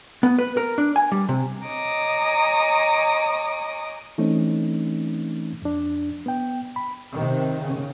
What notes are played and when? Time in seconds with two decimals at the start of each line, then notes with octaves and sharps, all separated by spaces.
0.23 B3
0.39 B4
0.57 A#4
0.78 D4
0.96 G#5
1.12 G3
1.29 C3
1.65 C#5 D#5 G#5 A#5 D6 D#6
4.18 E3 A3 C4 C#4 D#4
5.62 F2 D4
6.26 B3 G5
6.76 B5
7.14 C3 D#3
7.62 C#3